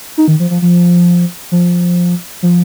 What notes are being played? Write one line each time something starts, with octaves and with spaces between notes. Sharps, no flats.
D#4
D#3
F3
F3
F3
F3
F3